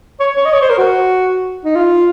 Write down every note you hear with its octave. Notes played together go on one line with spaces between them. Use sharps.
C#5
C#5
D#5
C#5
C5
A#4
F#4
D#4
F4